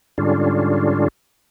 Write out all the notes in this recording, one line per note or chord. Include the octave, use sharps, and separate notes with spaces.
G#2 D3 G3 C#4 D4 F4